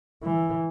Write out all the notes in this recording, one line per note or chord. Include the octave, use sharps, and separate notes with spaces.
E3